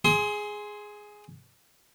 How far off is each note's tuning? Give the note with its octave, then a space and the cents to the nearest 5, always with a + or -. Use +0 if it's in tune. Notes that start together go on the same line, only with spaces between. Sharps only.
G#4 +0 C6 +0 D#6 +40